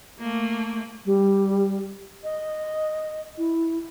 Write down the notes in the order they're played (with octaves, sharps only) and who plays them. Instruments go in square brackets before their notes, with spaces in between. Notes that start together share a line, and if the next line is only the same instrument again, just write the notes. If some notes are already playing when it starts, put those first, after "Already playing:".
[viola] A3 A#3
[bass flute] G3
D#5
E4